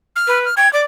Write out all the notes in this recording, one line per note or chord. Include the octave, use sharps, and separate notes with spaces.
F6
B4
F6
G5 G#6
D5 D6